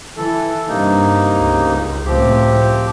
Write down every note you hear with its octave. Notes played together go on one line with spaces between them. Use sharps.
E3 A4
G2 C3 A#3 D#4
C#2
C#2 A2 C3 F3 C4 G4